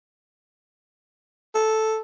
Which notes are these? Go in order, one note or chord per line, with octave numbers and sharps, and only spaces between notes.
A4